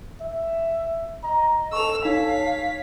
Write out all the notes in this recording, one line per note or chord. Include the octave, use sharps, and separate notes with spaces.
E5
D#5 A#5
A4 C#6 E6 F7
D#4 C#5 F5 B6